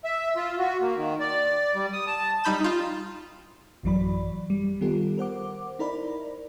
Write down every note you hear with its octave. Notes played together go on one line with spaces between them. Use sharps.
E5
F4
F#4
A#3
D#3
D5
G3
D#6
A5
G3 D#4 B5 G6 E7
D#4 F4
A1 F#2 E3 F#3 D5 B5
G3
D#3 G3 B3 F4 G4 A4
A#4 C5 F#5 D6
D#4 E4 A#4 C5 D5 B5